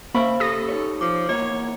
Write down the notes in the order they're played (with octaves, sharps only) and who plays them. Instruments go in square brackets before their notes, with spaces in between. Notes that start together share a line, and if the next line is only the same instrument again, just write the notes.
[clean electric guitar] C#3 B5 [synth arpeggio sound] A#3 [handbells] C5 F5 C#6 [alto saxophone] E5
[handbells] G4 [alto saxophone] A4 [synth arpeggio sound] D#6 A#6
[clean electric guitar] D#4 C#5
[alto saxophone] F3 [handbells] D6
[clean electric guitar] E2 A#3 D#5 [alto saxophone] C#5